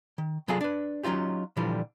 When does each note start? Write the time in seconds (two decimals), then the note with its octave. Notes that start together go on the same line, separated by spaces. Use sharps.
0.18 D#3
0.48 C2 F#3 F4 G#4 A4 F5
0.61 D4 B4
1.03 F#3 C#4 D#4 F4 G4
1.57 A#2 D3 E3 F3 G3